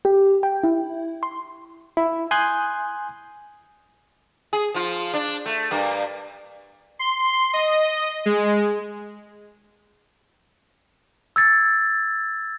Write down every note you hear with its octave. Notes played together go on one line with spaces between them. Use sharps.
G4
G5
E4
C6
E4
G#5 C6 D#6 F#6 G6
G#4
F3 F4
D4
A3
G2 A#3
C6
D#5
G#3
E6 G#6 A6